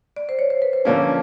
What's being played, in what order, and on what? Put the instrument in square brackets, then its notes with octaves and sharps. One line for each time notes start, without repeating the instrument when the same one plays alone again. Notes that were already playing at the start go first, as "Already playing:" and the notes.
[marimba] D5
C5
C#5
C5
B4
C5
[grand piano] D3 F3 A#3 C#4 [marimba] D5